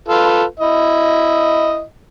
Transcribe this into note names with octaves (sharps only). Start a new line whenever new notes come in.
F4 A4 B4
E4 D#5